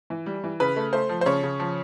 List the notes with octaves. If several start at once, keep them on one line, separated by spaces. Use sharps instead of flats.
E3
G3
E3
C#3 B4
A3
A3 C5
F3
C5
C#3 C#5
C#3
F3